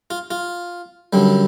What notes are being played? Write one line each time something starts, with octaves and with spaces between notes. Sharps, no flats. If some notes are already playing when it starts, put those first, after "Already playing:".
F4
F4
F#2 D3 G3